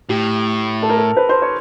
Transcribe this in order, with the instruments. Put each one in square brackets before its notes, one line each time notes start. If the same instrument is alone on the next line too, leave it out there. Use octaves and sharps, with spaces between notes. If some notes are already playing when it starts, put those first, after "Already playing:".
[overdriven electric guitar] A2 [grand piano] G4
[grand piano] A4
A#4
A4
B4
C5
C#5